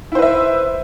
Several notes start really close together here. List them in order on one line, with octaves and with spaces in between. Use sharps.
E4 C5 B4 E5